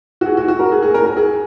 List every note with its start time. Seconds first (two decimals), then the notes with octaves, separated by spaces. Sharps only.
0.21 F#4
0.26 G#4
0.37 F#4
0.48 F#4
0.59 A#4
0.72 G#4
0.82 G#4
0.94 A#4
1.05 A#4
1.17 G#4